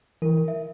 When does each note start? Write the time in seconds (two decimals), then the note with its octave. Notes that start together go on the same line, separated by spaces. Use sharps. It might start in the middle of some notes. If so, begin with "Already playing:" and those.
0.22 E3 A#4
0.48 E5